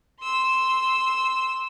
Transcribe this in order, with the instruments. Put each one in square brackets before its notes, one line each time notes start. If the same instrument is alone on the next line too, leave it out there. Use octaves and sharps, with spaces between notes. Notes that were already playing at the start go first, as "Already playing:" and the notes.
[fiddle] C6 E6